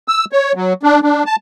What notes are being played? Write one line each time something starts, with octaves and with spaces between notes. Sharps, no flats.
E6
C#5
F#3
D4
D4
A5